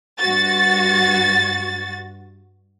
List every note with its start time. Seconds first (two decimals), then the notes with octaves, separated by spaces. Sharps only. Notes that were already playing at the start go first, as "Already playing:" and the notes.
0.19 G2 F#4 A6